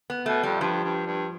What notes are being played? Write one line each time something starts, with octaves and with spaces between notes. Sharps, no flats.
B3
B2 A3
F2 G3
G2 F3
G2
G2